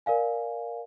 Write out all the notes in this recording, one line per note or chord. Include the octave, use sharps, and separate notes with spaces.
A#4 D5 F5 G#5